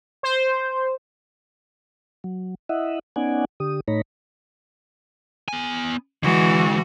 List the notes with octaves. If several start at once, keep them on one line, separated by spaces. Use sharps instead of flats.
C5
F#3
E4 D#5 E5 F#5
B3 C#4 D#4 D5 F#5 G#5
D3 G4 D#6
A2 A3 D#4 C#5 A#5 B5
B3 G#5
D3 E3 G#3 F#4